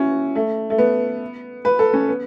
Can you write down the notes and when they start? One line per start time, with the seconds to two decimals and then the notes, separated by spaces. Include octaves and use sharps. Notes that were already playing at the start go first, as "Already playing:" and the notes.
Already playing: C#4 E4 F#4
0.35 A3
0.70 A3
0.78 B3
1.65 B4
1.79 A4
1.94 C#4
2.08 B3